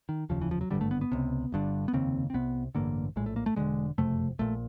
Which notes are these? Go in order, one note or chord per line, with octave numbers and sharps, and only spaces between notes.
D#3
F1 D#2 C#3 F3
E3
F3
F#3
G#1 G2 D3 G3
A3
B3
B3
C#2 C3
G1 G2 D3
B3
F1 D#2 C#3 C4
C4
C2 C3 B3
A1 G2 D3 A#3
A#1 A2 G#3
A3
A#3
A3
E1 D#2 D3 G#3
F#1 F2 C3 A3
A#1 A#2 A3